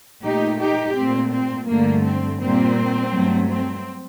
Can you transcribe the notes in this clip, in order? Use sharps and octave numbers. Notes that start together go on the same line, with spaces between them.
A#2 A3 D#4 G4
D#4 G4
A#2 A3 C4
C4
G2 D3 A3 A#3
C4
A#2 G3 A#3 C4
G2 F#3 A3
C4